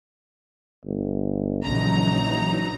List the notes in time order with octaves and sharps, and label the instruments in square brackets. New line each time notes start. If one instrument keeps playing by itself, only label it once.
[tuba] G1
[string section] A#1 A#5 [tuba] C#3 [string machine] E3 F#3 D#4